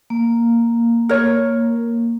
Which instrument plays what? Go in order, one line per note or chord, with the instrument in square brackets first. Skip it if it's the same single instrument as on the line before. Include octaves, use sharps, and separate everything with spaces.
[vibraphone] A#3
[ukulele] A#4 C#5